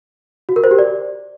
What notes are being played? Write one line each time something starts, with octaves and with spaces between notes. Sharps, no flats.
F#4
A#4
C5
G4
D5